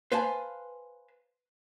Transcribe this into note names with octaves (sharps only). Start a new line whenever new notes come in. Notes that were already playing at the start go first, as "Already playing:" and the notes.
B4 C5 F5 G#5 A5